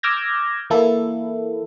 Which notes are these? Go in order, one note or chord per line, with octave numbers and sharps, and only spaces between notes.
D6 E6 F6 G6 G#6 A#6
E3 A#3 E4 A4